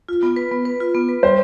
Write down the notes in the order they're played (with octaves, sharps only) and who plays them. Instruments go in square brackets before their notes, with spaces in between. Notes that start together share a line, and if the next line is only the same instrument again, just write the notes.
[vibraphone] F4
B3
B4
B3
B4
F4
B3
B4
[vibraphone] G3 [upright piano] C5